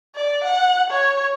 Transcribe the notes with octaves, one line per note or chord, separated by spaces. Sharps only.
D5
F#5
C#5